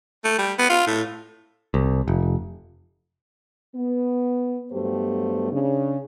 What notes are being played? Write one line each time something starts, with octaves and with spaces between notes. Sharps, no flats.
A3
G3
B3
F4
A2
C2
F1
B3
G2 F#3 A3 B3 G4 C5
C#3 D4